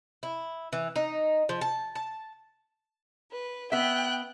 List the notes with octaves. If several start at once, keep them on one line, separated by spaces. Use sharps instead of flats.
E4
E3
D#4
F3
A5
A5
B4
B3 E5 G5 F#6